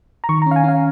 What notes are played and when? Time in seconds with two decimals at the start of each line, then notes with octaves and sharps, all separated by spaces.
0.24 A#5
0.29 D#3 C#6
0.42 A#5
0.46 C#4
0.51 F5
0.56 G#5
0.64 C#4 F5